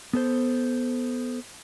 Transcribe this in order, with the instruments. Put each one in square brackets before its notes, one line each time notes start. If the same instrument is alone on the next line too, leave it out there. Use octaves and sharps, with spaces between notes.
[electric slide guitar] B3 A4 C5